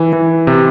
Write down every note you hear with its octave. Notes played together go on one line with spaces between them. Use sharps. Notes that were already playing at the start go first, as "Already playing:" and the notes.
Already playing: E3
E3
C3